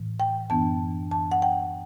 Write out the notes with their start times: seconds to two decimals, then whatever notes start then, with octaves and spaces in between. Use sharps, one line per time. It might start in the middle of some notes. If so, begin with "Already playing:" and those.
Already playing: A2 E3
0.20 G5
0.50 F#2 E3 B3 D4 A5
1.11 A5
1.32 F#5
1.42 G5